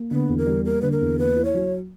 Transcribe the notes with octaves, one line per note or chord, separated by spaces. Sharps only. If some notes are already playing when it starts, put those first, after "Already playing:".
Already playing: A#3
D3 B3
E2
A#4
G3
A#3 A#4
D3 B4
A#4
E2
A#3 B4
E4
C#5
F#3